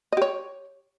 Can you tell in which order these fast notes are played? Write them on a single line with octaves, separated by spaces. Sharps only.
D#5 G4 C#5